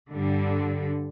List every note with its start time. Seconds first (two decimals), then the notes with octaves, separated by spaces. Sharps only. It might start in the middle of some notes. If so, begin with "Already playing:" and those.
0.11 G2 D3 G3